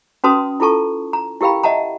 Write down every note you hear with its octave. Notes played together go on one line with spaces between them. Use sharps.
C#4 F#4 B4 A5 C6 D#6
E4 F4 A4 A5 C#6
A#5
E4 G4 A#4 F5 G5 B5
D#5 E5 F#5 A5 A#5